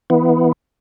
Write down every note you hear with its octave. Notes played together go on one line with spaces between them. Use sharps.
E3 B3